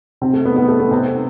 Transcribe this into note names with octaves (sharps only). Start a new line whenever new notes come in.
C3 C4
A3
B3
B3
A3
B3
C3 C4